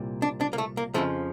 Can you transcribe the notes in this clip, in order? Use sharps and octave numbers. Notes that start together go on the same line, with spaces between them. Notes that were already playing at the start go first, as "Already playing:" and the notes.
Already playing: C2 A#2 G3
D4
D4
A#3
A3
A#3
F2 C#3 F3 A3